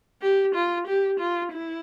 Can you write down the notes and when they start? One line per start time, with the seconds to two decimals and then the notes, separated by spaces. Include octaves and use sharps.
0.22 G4
0.55 F4
0.87 G4
1.19 F4
1.52 E4